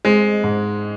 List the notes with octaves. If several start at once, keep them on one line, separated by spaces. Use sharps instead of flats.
G#3 C4
G#2